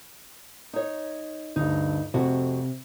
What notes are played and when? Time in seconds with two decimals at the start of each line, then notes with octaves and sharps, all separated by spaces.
0.73 D#4 C#5
1.56 D2 G2 D#4
2.14 F2 C3 A3 F#4